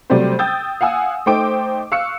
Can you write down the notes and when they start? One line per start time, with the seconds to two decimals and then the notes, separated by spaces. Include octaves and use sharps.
0.10 C3 F#3 G3 A3 C4 C5
0.39 G5 D#6 E6 G6 A6
0.81 F5 F#5 G#5 D#6 E6
1.26 A3 D#4 C5 G5 D6 D7
1.92 F5 C#6 E6 F#6 C#7